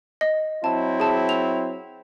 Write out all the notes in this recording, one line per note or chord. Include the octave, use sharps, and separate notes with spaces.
D#5
F#3 C4 E4 A5
G#4 A5
F7